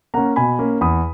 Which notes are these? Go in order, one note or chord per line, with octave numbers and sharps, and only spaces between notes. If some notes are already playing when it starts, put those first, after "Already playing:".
A#3 C#4 F#5 A#5
B2 G#5 B5
A#3 C#4
E2 B5 D#6